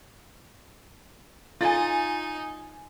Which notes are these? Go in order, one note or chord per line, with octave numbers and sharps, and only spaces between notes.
D#4 F4 G#5 A6